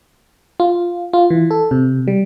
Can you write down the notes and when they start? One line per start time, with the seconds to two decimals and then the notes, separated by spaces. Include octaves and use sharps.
0.60 F4
1.13 F4
1.30 E3
1.51 A4
1.71 C3
2.08 G3